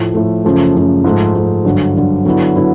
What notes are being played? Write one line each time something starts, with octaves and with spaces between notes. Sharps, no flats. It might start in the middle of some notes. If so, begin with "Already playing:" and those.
Already playing: A2 F3 A3
A2 F3 A3
F#2 C#3 F3 A3
F#2 C#3 F3 A3
G#2 F3 A3
G#2 F3 A3
G2 D3 F#3
G2 D3 F#3
D3 F#3 B3 E4
D3 F#3 B3 E4